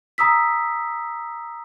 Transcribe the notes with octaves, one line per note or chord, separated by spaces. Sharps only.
A#5 D#6 E6 B6